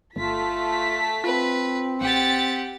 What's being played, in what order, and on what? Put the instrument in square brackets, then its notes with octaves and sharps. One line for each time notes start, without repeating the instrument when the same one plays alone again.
[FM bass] G1 [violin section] A3 A5 B6 [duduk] F4
[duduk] C4 [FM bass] F4 [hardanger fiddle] B4
[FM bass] A1 [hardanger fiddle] G4 F#5 [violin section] A6 B6